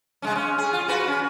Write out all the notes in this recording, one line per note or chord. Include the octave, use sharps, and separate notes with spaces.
C#3 G#3 C#4
C#4
G#4
F4
F#4 B4
C#4